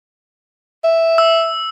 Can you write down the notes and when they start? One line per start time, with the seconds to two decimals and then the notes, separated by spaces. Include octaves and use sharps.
0.84 E5
1.18 E6